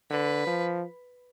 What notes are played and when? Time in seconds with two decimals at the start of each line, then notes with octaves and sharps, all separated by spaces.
0.11 D3 B4
0.47 F3